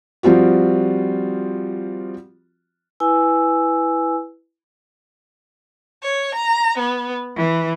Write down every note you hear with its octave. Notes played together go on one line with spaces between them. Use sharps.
F3 G3 C4 F4 F#4
E4 B4 G#5 E6
C#5
A#5
B3
E3